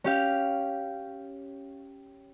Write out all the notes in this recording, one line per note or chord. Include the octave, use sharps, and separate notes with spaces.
C#4 G4 F5